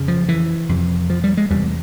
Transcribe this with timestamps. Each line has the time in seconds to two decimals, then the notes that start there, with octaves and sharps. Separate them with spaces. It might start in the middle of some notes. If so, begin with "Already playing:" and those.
Already playing: F2 C#3
0.08 F3
0.29 E3
0.69 F2 C3
1.10 F3
1.24 G3
1.37 G#3
1.50 E2 C3 G3